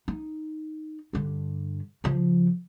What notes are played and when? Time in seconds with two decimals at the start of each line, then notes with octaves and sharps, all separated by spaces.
0.08 D#4
1.13 G2 D3
2.04 C#3 F3